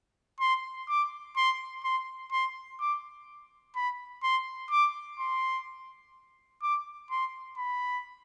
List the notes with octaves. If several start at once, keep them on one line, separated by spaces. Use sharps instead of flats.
C6
D6
C6
C6
C6
D6
B5
C6
D6
C6
D6
C6
B5